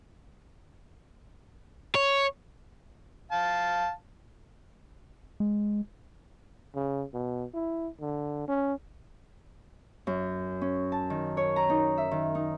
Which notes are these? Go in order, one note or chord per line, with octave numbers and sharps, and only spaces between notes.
C#5
F5 A5
G#3
C#3
B2
E4
D3
C#4
F#2
C#4
A5
D#3
C#5
A#5
D#4
E5
D#3
D#4